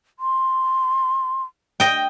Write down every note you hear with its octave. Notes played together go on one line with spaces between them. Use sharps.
C6
D#5 G5